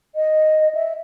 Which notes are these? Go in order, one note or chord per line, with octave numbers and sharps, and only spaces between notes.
D#5
E5